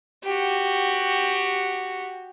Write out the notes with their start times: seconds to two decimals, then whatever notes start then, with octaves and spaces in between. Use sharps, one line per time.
0.24 F#4 G4